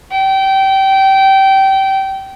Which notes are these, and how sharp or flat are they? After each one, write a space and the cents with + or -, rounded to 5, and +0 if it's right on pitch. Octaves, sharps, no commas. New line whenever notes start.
G5 -20